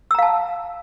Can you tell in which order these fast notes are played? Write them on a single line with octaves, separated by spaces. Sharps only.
E6 A#5 F5 A5